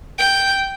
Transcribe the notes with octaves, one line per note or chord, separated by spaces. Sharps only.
G5